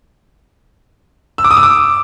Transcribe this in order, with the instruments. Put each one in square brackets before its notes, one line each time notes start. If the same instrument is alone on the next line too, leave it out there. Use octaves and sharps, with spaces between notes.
[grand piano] E6
D6
D#6
E6
D6